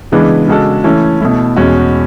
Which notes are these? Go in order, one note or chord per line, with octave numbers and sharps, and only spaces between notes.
C#3 E3 G#3 B3 D4
C#3 G#3 D4 F#4 A4
E3 A3 C#4 E4
B2 A3 E4
E2 B2 G#3 C#4 F#4